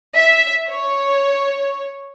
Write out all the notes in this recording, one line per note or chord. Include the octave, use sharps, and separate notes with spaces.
E5
C#5